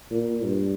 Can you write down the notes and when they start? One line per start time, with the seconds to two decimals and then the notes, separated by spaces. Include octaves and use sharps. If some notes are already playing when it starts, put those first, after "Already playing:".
0.11 A#2
0.45 G2